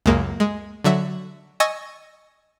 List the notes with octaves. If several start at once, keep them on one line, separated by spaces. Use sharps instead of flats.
C#2 F#2 G#3 A#3
G#3
D3 F#3 E5
D#5 G#5 C#6 E6 A6 A#6